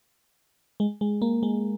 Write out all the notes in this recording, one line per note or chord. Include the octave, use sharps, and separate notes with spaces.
G#3
G#3
A#3
G#3